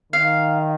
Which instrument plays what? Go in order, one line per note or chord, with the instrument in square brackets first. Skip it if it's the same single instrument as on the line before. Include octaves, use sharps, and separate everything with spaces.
[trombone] D#3 [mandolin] F5